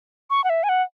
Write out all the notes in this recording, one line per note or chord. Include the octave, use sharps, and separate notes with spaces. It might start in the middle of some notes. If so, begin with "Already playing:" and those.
C#6
F#5
E5
G#5
F#5